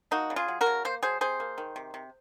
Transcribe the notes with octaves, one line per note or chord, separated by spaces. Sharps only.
A#3 D#4 F#4
C#3
F4 G#4
F#3
F#4 A#4
C#3
A#3 C5
F#3 G#4 C5
C3 G#4 C5
A#3
D#3
C3
C3